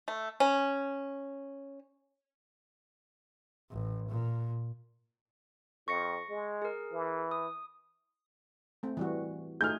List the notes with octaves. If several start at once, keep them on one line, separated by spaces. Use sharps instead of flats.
A3
C#4
A1
A#2
F2 C#6 A#6 C#7
G#3
G#4 A#4
E3
D#6
A3 C4
E3 G3 F#4
A3 D#4 G#4 F6 G6